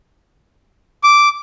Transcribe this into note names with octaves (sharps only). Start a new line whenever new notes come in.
D6